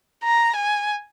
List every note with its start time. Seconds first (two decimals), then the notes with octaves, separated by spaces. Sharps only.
0.24 A#5
0.56 G#5